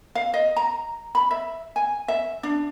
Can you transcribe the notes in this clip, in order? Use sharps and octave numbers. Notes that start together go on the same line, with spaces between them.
F5
D#5
A#5
B5
E5
G#5
E5
D4